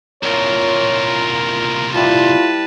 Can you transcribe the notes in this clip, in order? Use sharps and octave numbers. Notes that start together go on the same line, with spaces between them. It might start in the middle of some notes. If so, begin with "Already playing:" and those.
C2 A#2 F4 A#4 C#5
G3 E4 F4 B4 A5